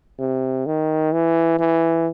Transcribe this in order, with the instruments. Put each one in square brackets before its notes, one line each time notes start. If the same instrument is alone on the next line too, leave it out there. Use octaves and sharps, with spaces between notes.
[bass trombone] C3
D#3
E3
E3